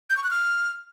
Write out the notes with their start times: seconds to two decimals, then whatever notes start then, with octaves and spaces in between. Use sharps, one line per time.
0.10 G6
0.17 C#6
0.24 F#6
0.31 F6